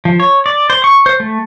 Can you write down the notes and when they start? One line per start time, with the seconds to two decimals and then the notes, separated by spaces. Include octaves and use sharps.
0.05 F3
0.20 C#5
0.46 D5
0.70 C5
0.84 C#6
1.06 C5
1.20 A3